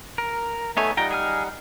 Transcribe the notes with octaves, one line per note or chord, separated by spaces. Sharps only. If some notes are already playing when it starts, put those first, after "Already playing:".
A#4
A3 B3 D#4 C#5 E5 G#5
G3 D#4 F4 F#5 G5 A#5
G#4 G#5 F6